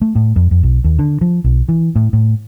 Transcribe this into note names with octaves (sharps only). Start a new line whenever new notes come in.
A3
A2
F2
F2
B1
D#2
D3
F3
B1
E3
A2
A2